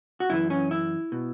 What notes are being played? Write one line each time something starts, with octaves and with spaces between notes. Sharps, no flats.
F#4
F#2 E3 E4
C#4
E4
B2